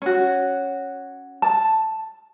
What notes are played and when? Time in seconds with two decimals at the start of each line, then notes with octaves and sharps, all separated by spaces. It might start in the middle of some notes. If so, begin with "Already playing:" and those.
0.02 C#4 F#4
1.42 A5